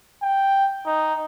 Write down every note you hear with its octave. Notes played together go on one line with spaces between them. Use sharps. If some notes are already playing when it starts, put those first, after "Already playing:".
G5
D#4